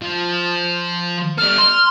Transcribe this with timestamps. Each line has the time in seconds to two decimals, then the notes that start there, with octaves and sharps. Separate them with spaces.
0.02 F3
1.38 G3 A4 F6
1.58 C6